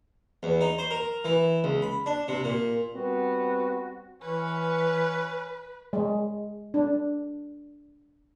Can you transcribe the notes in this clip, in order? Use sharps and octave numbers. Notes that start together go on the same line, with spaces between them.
E2
D#4
C5
A#4
E3
C#2
B5
D4
C3
A#2
G3 B3 C4 F#4
E3 C#4 B4
G#3
D4